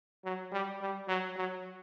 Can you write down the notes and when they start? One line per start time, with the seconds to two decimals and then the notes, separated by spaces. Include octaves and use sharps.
0.25 F#3
0.52 G3
0.81 G3
1.08 F#3
1.36 F#3